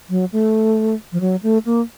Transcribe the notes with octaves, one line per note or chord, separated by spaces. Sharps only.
F#3
A3
F3
F#3
A3
A#3